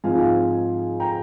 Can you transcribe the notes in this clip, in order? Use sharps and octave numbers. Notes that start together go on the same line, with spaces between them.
G#2 F3 C4 D#4 F5 G#5
G5 A#5